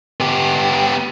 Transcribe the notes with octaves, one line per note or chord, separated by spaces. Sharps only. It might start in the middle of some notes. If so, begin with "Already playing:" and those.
B3 G4